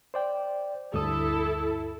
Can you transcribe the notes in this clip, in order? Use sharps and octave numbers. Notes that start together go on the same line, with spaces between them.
C5 D5 G5
D2 G2 E4 A4 D#6